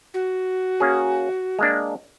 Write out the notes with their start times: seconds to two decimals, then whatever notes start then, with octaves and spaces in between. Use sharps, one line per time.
0.14 F#4
0.80 A#3 C#4 G#4
1.59 G#3 A#3 D4